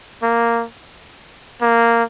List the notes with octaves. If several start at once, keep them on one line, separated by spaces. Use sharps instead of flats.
A#3
A#3